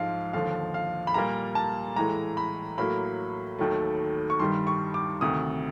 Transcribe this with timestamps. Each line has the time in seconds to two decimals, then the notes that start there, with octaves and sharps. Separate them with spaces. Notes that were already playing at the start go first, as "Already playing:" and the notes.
Already playing: G#2 F3 G#3 F5
0.33 D#2 D3 F3 F5
0.74 F5
1.07 B5
1.14 A#2 G3 A#3 A#5
1.55 A5
1.96 A2 E3 G#3 A#5
2.37 B5
2.78 A2 F#3 A#3 B5
3.59 D#2 D#3 F#3 A3
4.30 C#6
4.39 G2 D#3 G3 C6
4.67 C#6
4.94 D6
5.21 D2 C3 D#3 D#6